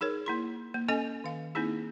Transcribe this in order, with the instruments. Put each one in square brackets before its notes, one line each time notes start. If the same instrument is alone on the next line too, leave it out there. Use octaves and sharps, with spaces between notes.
[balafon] D#4 G#4 A#4 C#5
A#3 E4 C6
A#3
C#4 A4 D#5 G#5
D#3 F5
A#3 C4 D#4 E4 G#4